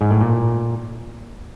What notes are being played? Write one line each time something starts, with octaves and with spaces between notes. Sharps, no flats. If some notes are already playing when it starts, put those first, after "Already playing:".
G#2
A2
A#2